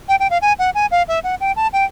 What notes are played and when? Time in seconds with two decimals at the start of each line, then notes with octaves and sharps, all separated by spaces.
0.08 G5
0.20 G5
0.30 F5
0.42 G#5
0.59 F#5
0.75 G#5
0.91 F5
1.08 E5
1.24 F#5
1.41 G5
1.56 A5
1.73 G5